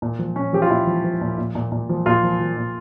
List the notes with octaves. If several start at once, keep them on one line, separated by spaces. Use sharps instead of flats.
A#2
F3
A#2 C#4
F3 G4
F4
A#2 E4
F3
F3
A#2
A#2
A#2
A#2
F3
A#2 F4
F3
F3
A#2